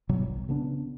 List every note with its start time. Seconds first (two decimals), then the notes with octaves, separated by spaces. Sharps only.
0.09 G1 B2 F#3 G3
0.27 B1
0.49 C#3 B3 D4